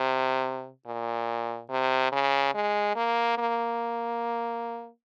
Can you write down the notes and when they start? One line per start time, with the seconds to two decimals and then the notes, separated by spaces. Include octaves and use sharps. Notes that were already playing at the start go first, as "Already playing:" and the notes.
Already playing: C3
0.86 A#2
1.70 C3
2.12 C#3
2.54 G#3
2.96 A#3
3.38 A#3